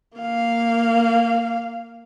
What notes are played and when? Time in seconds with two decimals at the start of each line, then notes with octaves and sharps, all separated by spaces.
0.18 A#3 F5